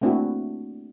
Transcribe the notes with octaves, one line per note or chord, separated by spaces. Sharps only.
A3 A#3 C4 D4 E4 F#4